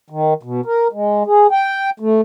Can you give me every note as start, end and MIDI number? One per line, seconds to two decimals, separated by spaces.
0.10 0.34 51
0.43 0.61 47
0.65 0.88 70
0.93 1.23 56
1.26 1.47 68
1.51 1.90 79
2.00 2.21 57